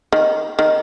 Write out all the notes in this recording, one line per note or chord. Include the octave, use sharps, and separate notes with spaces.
D#3
D#3